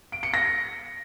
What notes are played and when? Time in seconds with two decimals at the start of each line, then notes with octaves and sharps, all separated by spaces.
0.12 D7
0.23 C#7
0.34 A#6